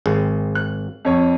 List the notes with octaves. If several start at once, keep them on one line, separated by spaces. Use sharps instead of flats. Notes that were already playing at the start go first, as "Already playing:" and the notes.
G#1 G#4
F#6
F2 C#5